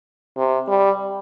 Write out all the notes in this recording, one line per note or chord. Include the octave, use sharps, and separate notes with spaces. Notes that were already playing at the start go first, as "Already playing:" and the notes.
C3
G3